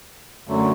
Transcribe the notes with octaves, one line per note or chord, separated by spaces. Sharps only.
F#2 D3 F#3 A3